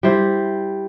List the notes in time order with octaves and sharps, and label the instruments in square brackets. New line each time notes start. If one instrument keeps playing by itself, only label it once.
[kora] G3 E4 C5